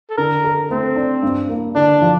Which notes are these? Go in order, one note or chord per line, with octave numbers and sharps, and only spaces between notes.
A4
D3 A#4
A4
A3 C4
D4
G2
A#3
D3 D4
F3